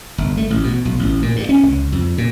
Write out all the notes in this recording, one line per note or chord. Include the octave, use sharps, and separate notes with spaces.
G1
A3
A1
B2
B1
A1
A#2
G2
C#4
C#2
F2
A#2